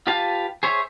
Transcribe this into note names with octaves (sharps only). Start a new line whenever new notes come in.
F4 G4 B4 F5 A5
G#4 C5 C#5 E5